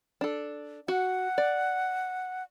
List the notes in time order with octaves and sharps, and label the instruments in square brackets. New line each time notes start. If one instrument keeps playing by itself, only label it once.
[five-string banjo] D4 A4
[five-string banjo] F#4 [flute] F#5
[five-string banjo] D5